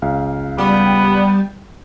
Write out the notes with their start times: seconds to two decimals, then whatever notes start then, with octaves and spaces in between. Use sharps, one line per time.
0.02 C#2 F5
0.58 G3 B3